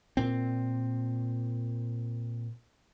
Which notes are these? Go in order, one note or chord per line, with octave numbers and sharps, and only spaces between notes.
A#2 C4